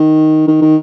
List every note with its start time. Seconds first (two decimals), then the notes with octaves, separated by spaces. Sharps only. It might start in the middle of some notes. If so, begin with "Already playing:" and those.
Already playing: D#3
0.48 D#3
0.62 D#3